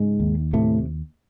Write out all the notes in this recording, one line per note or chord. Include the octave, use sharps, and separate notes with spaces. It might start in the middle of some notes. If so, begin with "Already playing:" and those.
Already playing: G#2 C#3 G#3
D#2
A2 C3 A3